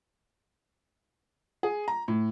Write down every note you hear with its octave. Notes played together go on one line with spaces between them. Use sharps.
G#4
A#5
A2